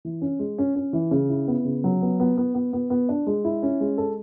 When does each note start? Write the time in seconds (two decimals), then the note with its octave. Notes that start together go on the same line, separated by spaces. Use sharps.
0.05 E3
0.21 C#4
0.39 G#3
0.58 C#4
0.76 C#4
0.93 E3
1.11 C#3
1.29 E4
1.48 B3
1.65 C#3
1.84 F#3
2.02 B3
2.20 B3
2.38 B3
2.55 B3
2.73 B3
2.90 B3
3.09 D4
3.27 G#3
3.44 E4
3.63 C#4
3.80 G#3
3.98 A4